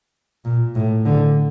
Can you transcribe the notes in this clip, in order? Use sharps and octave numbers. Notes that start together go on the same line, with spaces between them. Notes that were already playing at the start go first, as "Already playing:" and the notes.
A#2
A2
D3